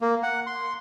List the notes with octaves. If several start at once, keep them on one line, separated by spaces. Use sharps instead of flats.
A#3
F#5
C6